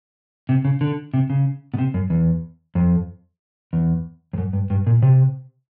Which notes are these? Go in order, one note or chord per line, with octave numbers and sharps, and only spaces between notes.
C3
C#3
D3
C3
C#3
B2
C3
F#2
E2
F2
E2
F2
F#2
G2
G2
A#2
C3